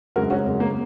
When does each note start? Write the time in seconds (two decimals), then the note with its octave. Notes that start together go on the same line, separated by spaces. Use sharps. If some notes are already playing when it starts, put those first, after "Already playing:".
0.16 F#2 C#3 G#3 F#4 A#4
0.30 C#4 F#4
0.46 F#2 C#3 G#3
0.60 A#3